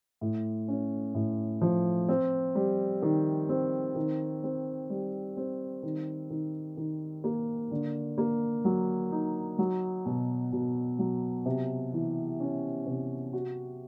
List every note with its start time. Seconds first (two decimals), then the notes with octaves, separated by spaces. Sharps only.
0.21 A2
0.68 C#4
1.15 A2
1.62 F3
2.09 C4
2.55 G3
3.02 D#3
3.49 C4
3.96 D#3
4.44 C4
4.90 G3
5.37 C4
5.83 D#3
6.30 D#3
6.77 D#3
7.24 A#3
7.71 D3
8.18 A#3
8.65 F#3
9.12 D#4
9.59 F#3
10.06 B2
10.52 B2
10.99 F#3
11.46 C3
11.93 E3
12.40 C#4
12.87 C3
13.33 F#4